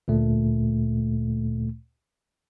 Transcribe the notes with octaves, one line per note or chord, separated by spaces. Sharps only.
D2 A#2 A3